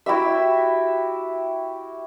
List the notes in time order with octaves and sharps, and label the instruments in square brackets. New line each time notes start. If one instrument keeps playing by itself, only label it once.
[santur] E4 F#4 G4 E5